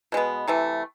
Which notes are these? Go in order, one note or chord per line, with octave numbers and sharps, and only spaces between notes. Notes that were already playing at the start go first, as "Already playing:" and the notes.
B2 G#3 B3
C3 E3 A3